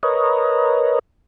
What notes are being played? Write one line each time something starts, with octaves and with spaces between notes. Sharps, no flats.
A#4 B4 C#5 D#5